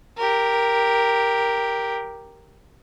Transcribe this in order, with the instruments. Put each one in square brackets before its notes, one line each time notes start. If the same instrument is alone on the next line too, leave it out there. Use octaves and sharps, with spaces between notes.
[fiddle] G4 A#4